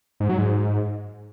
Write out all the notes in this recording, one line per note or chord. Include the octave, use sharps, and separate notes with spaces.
G#2
F#3
G#2